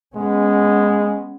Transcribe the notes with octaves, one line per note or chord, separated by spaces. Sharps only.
G#3 B3 C#4